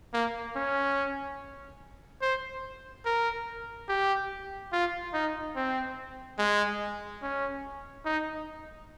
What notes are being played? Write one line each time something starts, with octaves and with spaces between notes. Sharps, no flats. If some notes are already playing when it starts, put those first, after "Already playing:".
A#3
C#4
C5
A#4
G4
F4
D#4
C4
G#3
C#4
D#4